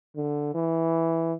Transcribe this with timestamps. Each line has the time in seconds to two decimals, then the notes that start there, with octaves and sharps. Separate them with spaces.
0.16 D3
0.55 E3